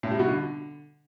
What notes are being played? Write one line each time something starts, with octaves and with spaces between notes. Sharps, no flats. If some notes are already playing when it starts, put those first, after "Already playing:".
A2
G3
B2
D3